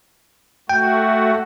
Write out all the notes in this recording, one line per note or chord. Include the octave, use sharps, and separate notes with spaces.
A3 F#4 G5